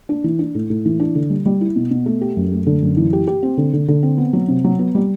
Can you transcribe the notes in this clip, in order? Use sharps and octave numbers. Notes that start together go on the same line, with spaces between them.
D4
E3
D4
A2
A2
E3
D4
D3
G3
G3
E4
B2
B2
A3
G4
F#2
A3
D3
F#2
E3
G4
G4
C4
D3
D3
D3
C4
B3
F#3
C3
F#3
B3
G3